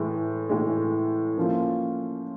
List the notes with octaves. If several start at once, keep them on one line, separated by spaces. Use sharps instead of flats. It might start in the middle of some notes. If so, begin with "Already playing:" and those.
Already playing: A2 E3 G#3
A2 E3 G#3
F3 A#3 C#4 F4